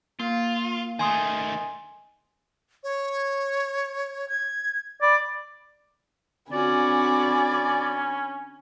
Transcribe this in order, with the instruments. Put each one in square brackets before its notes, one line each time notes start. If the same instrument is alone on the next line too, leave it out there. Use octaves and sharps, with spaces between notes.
[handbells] A#3 [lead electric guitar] F4
[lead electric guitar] D#3 A3 [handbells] G#5 C6 D#6
[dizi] C#5
G#6
[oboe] D5 [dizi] B5
[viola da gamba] D3 C4 F#4 [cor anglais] C#4 [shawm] D5 [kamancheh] G#5 B5